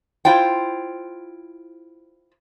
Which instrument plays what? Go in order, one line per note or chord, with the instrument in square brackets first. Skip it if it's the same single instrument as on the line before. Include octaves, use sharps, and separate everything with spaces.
[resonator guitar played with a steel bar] E4 F4 C5 G5